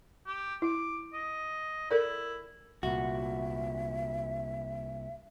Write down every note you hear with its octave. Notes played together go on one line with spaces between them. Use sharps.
G4
E4 D6
D#5
E4 A4 A#4 D5
C2 A#2 F#4 E5